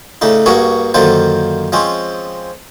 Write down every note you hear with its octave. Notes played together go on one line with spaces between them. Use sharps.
A2 C#3 D4 D#4
G2 A#3 F#4 G#4 C#6
F#2 D3 D#3 A#3 F4 C5
F3 G#3 C4 C#4